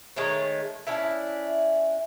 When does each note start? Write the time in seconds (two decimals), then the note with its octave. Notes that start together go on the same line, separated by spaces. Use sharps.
0.16 D#3 G#3 A3 C#5
0.87 C#4 D4 E4 E5